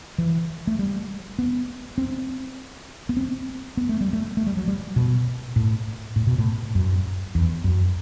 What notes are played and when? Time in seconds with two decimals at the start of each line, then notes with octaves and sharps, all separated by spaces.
0.18 E3
0.67 A3
0.79 G3
1.39 B3
1.98 C4
3.09 B3
3.17 C4
3.77 B3
3.89 A3
4.01 G3
4.13 A3
4.37 A3
4.47 G3
4.57 F#3
4.68 G3
4.96 B2
5.56 A2
6.16 A2
6.27 B2
6.38 A2
6.75 F#2
7.35 E2
7.64 F#2